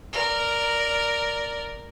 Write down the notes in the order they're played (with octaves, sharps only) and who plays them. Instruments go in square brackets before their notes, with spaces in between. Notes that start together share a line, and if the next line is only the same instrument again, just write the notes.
[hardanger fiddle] A#4 D5